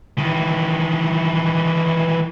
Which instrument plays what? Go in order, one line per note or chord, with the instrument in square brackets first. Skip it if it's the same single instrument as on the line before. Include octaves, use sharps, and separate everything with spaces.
[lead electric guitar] D#3 E3